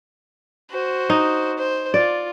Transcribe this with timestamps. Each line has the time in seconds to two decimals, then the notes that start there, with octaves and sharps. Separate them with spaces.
0.72 F#4 C5
1.10 D#4
1.58 C5
1.94 F4 D5